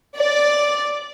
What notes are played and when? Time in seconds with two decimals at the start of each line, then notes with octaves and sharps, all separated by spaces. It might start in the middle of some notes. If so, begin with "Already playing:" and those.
0.17 D5